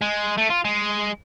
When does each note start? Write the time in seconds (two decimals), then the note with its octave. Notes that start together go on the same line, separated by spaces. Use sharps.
0.01 G#3
0.37 A3
0.50 F4
0.65 G#3